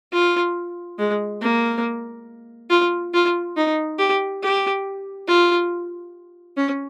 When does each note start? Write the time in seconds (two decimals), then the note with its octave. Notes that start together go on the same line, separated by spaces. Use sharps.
0.13 F4
0.99 G#3
1.42 A#3
2.70 F4
3.14 F4
3.57 D#4
3.99 G4
4.43 G4
5.28 F4
6.57 C#4